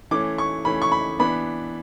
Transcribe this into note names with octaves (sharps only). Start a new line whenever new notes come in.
E3 A3 C#4 D6
C#6
E3 A3 C#4 B5
C#6
B5
E3 B3 D4 B5